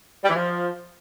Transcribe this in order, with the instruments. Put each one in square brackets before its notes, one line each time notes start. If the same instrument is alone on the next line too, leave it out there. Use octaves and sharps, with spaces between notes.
[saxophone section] G3
E3
F3